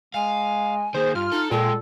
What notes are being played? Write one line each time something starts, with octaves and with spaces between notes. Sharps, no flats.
G#3 F5 G#5
D#3 A#3 G#4 C5
G2 F4 F6
D#4 A4
A#2 G#3 A4 G5